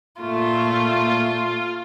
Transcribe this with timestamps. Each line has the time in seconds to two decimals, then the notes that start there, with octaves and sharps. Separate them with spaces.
0.21 A#2 A3 F4